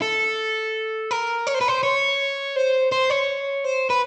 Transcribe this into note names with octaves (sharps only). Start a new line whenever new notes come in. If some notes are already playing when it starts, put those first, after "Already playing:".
A4
A#4
C#5
C5
B4
C5
C#5
C5
C5
C#5
C5
B4